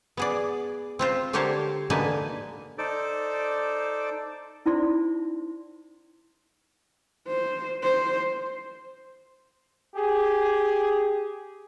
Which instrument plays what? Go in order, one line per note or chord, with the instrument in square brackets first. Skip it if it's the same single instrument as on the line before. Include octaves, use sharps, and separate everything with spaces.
[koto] B3 G#4 D5
C4 F4 C5
D3 G4 A#4 C5 C#5 A5
D3 A#3 D#4 B4 G#5 A5
[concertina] D#4 A4 C5 D5 D6
[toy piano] C#4 D#4 E4 C5 D5 C6
[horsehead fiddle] C5
C5
[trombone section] G4 G#4